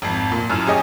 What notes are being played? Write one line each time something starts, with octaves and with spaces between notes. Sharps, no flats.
G#1 F2
A#2
F#2 A2 F6
C#4 G4 G#4 D#5 G#5